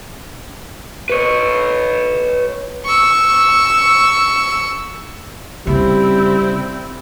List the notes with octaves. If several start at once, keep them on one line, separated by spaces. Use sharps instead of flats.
B4 C#5
C#6 E6
C#3 G3 C4 E4